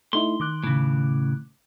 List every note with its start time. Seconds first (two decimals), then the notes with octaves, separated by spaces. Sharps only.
0.13 A3 D#4 E4 C6
0.40 D#3 D6 F#6
0.64 A2 C#3